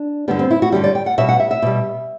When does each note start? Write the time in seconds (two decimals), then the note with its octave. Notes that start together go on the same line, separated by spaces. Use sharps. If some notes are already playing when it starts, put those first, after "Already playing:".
Already playing: D4
0.28 G2 D3 G3 B3
0.39 C4
0.51 E4
0.62 F#4
0.72 G2 D3 G3 G4
0.84 D5
0.95 G5
1.06 F#5
1.18 B2 G3 E5
1.29 F#5
1.40 E5
1.51 E5
1.62 B2 G3